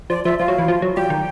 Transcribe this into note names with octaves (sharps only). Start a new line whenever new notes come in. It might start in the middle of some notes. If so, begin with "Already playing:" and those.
F3 D5
F3 E5
F3 F5
F#3
E3
F3
F#3
G3 G5
D#3